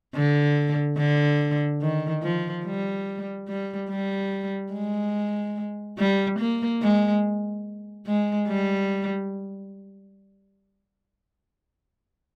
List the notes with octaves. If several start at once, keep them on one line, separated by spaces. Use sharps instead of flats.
D3
D3
D#3
F3
G3
G3
G3
G#3
G3
A#3
G#3
G#3
G3